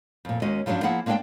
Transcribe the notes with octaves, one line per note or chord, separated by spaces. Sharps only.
F2 A#2
D#2 G#3 C#4 F#4 D#5
G2 F3 F#3 C#4 D4
F3 A#3 E4 G#4 F#5
G#3 A#3 D4 E4 D5 G5